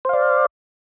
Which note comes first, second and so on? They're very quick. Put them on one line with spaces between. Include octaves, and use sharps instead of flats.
C5 F5 D5